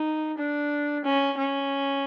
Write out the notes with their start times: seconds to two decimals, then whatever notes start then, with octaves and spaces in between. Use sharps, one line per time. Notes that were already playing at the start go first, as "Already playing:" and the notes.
Already playing: D#4
0.37 D4
1.04 C#4
1.38 C#4